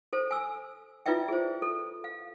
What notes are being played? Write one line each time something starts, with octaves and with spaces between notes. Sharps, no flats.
A4 C5
G#5 E6
E4 F4 B4 D5 E5 G5
G#4 C5
A4
F5